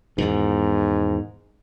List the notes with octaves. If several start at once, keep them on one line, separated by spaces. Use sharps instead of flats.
E2 G#2 B2 D#3